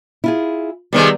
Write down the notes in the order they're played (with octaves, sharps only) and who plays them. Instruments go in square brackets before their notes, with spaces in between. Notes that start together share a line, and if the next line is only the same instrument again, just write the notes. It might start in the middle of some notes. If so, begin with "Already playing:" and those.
[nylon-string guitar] E4 F4 G#4
[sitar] C3 D#3 G#3 [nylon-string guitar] G3 B3